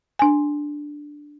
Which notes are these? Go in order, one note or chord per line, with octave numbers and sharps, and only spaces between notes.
D4 G#5